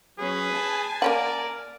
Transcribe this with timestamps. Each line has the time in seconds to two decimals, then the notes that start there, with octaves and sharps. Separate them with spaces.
0.19 F#3 C#4 G#4 B4
0.53 G#5 A5
1.02 A#3 C#4 A#4 D5 F#5